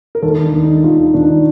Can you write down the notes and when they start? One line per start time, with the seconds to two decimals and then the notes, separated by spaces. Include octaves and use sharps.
0.15 A#4
0.23 D#2 A4
0.43 D4
0.54 D#3
0.63 D#4
0.84 D#2 F4
1.14 D#3 D4